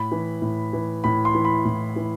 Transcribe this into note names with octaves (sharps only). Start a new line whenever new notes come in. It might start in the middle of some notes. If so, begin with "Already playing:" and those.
Already playing: A2 B5
E3
A2
E3
A2 B5
C6
E3
B5
A2
E3